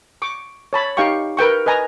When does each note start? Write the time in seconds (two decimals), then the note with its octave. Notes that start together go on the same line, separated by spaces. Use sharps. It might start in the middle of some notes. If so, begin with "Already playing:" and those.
0.22 C#6 D6
0.73 C#5 A5 B5
0.97 D#4 G4 F5 G5 C#6
1.37 A#4 B4 G5 C#6
1.66 B4 D#5 G#5 A#5